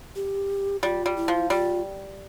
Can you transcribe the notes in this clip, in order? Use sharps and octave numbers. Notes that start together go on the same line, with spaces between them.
G4
G3 F4
G3
E4
F3
G3 F4